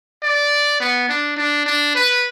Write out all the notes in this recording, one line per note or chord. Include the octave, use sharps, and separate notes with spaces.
D5
B3
D4
D4
D4
B4